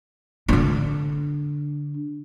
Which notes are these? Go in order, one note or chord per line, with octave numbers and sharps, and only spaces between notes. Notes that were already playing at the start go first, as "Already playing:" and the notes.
D3 D4